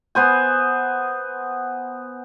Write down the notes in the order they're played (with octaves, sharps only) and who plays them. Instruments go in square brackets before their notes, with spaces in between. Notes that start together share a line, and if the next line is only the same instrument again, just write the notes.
[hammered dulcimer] B3 C5 G#5